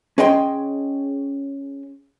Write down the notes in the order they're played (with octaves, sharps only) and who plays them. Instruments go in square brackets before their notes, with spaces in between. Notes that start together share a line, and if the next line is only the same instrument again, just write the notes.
[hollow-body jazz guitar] C#4 G#4 D#5 G5 C6